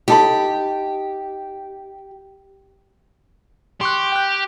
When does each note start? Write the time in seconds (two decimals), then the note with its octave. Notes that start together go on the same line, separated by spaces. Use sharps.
0.08 D#4 G4 A4 B5
3.81 G4 C6 C#6 F#6
4.12 G5 F#6